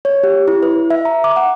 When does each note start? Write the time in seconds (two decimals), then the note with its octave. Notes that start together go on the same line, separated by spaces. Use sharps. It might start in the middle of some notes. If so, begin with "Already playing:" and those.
0.05 C#5
0.23 G4
0.48 E4
0.63 B4
0.90 E5
1.05 A#5
1.24 D6
1.36 F#5